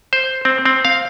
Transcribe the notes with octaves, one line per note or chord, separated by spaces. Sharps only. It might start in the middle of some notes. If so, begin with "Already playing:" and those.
C5
C4
C4
F5